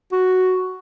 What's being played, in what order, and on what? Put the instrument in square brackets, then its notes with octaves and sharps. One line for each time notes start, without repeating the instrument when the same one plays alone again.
[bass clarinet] F#4